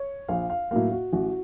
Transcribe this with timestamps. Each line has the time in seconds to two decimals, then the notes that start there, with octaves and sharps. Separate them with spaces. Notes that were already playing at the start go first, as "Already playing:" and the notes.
Already playing: C#5
0.28 A#1 F5
0.50 F5
0.71 A2 F#3 A#3 F5
0.92 F#4
1.13 A1 F#4